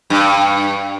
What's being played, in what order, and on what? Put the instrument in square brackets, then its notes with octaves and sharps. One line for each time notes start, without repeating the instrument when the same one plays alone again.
[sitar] G2